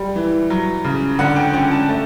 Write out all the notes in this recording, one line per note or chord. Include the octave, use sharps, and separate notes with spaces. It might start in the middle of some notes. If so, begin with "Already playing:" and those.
Already playing: G3
E3
F#3
C#3
D3 F#5
G5
C#4 G5
A5
A3